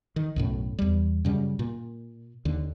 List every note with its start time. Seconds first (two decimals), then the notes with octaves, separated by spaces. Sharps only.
0.16 D#3
0.36 B1 F#2 A2
0.79 E2 G3
1.25 F#2 C#3 G3
1.59 A#2
2.45 D#2 D3